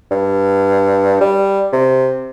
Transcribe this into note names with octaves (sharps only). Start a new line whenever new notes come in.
G2
G3
C3